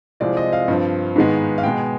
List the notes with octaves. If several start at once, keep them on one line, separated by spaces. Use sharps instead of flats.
C2 C3 F3 G#3 C4 D5
D#5
F5
G2 F3 C4
G#2 D#3 G#3 B3
F5
B2 G#3 B3 G5